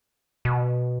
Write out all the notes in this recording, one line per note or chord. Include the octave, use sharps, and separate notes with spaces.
B2